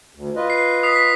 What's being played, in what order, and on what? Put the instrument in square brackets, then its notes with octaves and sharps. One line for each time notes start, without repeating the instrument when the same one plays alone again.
[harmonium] D2
F4 B4 D#5
[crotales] C7
D#6 B6 C7
B6